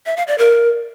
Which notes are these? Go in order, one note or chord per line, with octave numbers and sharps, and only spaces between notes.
E5
F5
D5
A#4